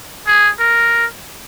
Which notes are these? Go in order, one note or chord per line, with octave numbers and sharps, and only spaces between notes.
G#4
A#4